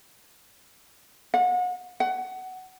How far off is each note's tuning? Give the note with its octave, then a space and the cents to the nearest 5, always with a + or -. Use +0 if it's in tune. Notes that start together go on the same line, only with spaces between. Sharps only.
F#5 -35
F#5 +20